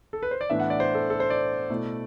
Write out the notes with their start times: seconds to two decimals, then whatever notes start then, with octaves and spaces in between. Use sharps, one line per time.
0.13 A4
0.23 B4
0.31 C5
0.41 D5
0.50 A2 E3 B3 D4 E5
0.60 F#5
0.70 D5
0.80 C5
0.95 A4
1.10 A4
1.20 C5
1.30 D5
1.70 B2 A3 E4